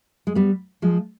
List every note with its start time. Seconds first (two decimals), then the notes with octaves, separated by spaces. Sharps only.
0.27 G#3
0.35 G3 B3
0.82 F3 G#3